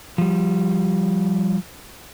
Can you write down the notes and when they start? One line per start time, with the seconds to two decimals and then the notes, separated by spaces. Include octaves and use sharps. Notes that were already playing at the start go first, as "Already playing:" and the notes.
0.18 F3 G3